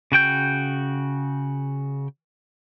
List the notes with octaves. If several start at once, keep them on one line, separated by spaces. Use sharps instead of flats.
C#3 F#4 G5 G6